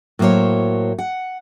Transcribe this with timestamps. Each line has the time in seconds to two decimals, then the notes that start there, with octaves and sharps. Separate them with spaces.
0.19 A2 F#3 A#3 F4 C5 C#5
0.98 F#5